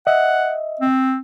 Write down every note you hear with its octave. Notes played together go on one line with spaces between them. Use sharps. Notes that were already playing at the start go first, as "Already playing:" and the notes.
D#5 E5 F#5
C4